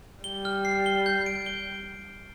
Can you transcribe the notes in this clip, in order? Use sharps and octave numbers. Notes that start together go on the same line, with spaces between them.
G3 G7
F6
C7
G7
G6
D7
G7